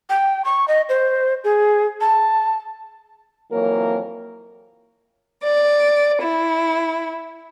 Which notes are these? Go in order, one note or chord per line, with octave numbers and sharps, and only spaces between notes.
G5
C#6
D#5
C5
G#4
A5
F2 E3 F#3 A#3 A#4 C#5
D5
E4